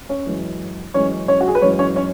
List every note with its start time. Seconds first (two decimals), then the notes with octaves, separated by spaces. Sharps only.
0.09 C#4 C#5
0.26 F#2 E3 G#3
0.94 F#2 E3 G#3 C#4 C#5
1.28 C#4 C#5
1.41 F#4
1.48 G#4
1.55 B4
1.62 F#2 E3 G#3 C#4 C#5
1.79 C#4 C#5
1.96 C#4 C#5